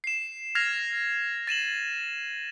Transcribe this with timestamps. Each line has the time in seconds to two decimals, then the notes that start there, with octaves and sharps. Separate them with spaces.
0.04 C7 E7
0.55 F6 G#6 A#6 C7 F7
1.47 A6 D#7 E7 F#7